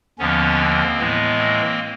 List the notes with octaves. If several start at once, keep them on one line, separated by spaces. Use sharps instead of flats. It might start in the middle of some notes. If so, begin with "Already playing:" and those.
D#2 D3 F3 B3 C#4
A#3 C4
A2 E3 G#3 B3
A#3 C4